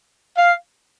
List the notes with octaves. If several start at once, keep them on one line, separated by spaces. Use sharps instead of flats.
F5